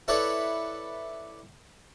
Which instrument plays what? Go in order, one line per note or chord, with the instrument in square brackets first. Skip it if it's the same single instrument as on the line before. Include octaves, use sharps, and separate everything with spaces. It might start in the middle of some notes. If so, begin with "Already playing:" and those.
[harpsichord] E4 A4 B4 C#5 D5